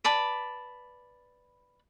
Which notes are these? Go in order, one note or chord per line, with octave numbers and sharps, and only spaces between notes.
B4 D5 A5 B5